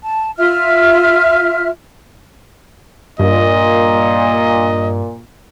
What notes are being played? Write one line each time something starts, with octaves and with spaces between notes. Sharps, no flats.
A5
F4 E5 F6
G2 A#2 D#5